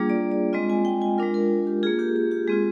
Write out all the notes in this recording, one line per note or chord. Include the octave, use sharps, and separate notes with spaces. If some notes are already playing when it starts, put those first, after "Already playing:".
Already playing: G3 A#3 D4 F4 G#4
D5
D5
G#3 C4 F4 D#5
G#5
G5
G#5
G#3 D4 F4 A#4
A#4
G4
A#3 F4 G#4
G4
G#4
G4
G#3 C4 F4 G#4